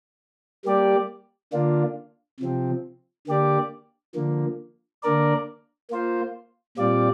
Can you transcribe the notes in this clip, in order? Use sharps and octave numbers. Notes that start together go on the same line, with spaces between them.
G3 A#3 G4 D5
D3 A#3 D4 F4
C3 F3 C4
D3 A#3 G4 D5
D3 F3 A#3
D3 A#3 D4 A#4 D5
A#3 F4 C5
A#2 G3 C4 F4 D5